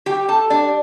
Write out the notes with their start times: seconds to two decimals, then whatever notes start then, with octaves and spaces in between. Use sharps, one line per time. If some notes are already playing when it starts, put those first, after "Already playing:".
0.06 G3 G4 G5
0.28 A4 A5
0.50 G3 D4 D5